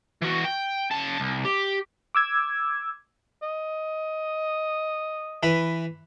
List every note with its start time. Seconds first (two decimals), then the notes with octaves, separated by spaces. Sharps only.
0.22 E3 F#4
0.45 G5
0.91 C#3 A5
1.20 C2
1.45 G4
2.15 D6 E6 G#6
3.42 D#5
5.43 E3 B4 B5